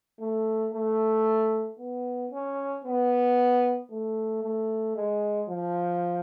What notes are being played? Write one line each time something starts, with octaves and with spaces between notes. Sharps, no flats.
A3
A3
B3
C#4
B3
A3
A3
G#3
F3